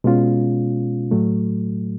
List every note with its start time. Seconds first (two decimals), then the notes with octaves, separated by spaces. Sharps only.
0.04 B2 G#3 C#4 F4
1.11 A2 F#3 A3